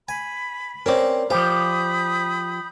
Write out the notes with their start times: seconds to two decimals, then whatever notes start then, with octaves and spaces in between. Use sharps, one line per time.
0.09 G#5 B5
0.86 C4 C#4 A#4 C5 D5
1.30 F3 G4 C5 F5 B5 D#6 G6